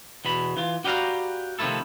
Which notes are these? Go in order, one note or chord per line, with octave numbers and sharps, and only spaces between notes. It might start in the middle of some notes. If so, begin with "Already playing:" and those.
E2 B2 B5
E3 F4
F#4 G4 B4 D5 F5 A#5
C3 D#3 F3 A3 E4 A4